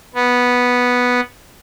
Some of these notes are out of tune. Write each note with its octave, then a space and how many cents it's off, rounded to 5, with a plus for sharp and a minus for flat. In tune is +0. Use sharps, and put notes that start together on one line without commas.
B3 -5